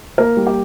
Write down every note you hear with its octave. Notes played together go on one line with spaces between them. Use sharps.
A#3 A#4
G3
G4